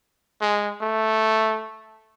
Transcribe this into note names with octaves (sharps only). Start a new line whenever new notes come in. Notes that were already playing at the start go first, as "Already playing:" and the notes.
G#3
A3